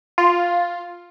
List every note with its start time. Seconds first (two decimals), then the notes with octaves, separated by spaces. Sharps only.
0.18 F4